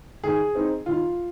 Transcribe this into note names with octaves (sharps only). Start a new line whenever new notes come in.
D#3 G#4
C4 D#4
D#3 F4